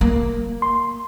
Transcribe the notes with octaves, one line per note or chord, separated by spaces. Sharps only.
A#3
C6